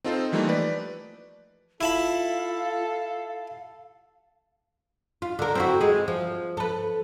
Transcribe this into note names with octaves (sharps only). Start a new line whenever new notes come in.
C4 D#4 F4 A4 C5
E3 F3 G3 A3 A#3 D#4
B4 D5
E4 F4 A4 F5 A5 B5
F4
D3 A#4
C4 E4 F#4
G#3 G#4
F3
A4 B4